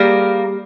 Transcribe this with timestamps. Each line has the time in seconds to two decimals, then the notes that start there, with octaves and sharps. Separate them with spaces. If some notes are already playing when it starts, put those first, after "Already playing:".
Already playing: G3 A#3 G#4 A#4